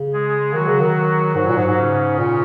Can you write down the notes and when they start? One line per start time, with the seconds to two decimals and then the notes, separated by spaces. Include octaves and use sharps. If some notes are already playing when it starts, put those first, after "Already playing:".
Already playing: C#3
0.13 G#3 G#4
0.54 D#3 F#3 F#4
0.68 C#3
0.81 D#3
1.35 G#2 F#3 F#4
1.47 A#2
1.56 G#2
1.67 G#2
1.77 C#3 C#4
2.18 A#2